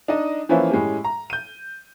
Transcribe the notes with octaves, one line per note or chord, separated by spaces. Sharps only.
D4 D#4 D#5
E3 F3 A#3 C#4 B4 E5
A2 G#3 C#4 G4
A#5
G6 D#7